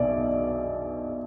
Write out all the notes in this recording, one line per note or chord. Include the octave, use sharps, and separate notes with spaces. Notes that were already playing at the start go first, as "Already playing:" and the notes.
Already playing: B1 B2 D5 E5 G#5